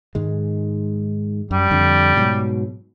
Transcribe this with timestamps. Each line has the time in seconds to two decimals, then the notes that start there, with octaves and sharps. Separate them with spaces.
0.15 G#2 D#3 G#3
1.51 F#2 G3
1.71 F2 D3
2.16 G#2 B2 F#3